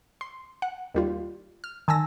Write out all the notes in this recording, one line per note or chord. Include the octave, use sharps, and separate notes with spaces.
C6
F#5
D#2 G3 F4
F6
D#3 G#5 A5 E6 A#6